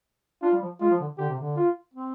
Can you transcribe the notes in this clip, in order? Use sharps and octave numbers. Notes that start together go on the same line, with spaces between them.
D4 F4
G3
F3
G#3 F4
F3
D3
D3 G4
C3
D3
F4
C4